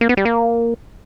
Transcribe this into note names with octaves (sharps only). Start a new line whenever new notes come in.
A#3
B3
G3
A#3